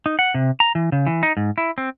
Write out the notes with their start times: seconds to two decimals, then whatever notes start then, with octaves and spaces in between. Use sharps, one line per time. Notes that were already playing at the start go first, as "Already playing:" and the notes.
0.06 D#4
0.19 F#5
0.34 C3
0.60 A#5
0.75 E3
0.92 C#3
1.07 E3
1.23 D#4
1.37 G#2
1.58 E4
1.78 C4